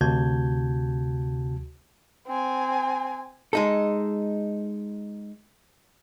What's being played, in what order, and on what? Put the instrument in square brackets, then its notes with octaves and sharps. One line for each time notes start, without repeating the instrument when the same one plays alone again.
[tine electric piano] D2 C3 F#4 A5 G6 G#6
[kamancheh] C4 G#5
[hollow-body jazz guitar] G#3 D#4 A4